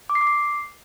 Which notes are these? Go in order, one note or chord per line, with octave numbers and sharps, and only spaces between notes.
D6
C7
D6
C7